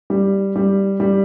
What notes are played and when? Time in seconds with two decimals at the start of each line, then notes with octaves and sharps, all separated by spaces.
0.10 G3
0.56 G3
1.00 G3